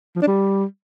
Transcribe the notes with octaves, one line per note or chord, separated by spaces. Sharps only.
F3
D4
G3